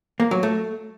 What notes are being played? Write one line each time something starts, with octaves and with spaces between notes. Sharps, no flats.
A#3
F#3
A3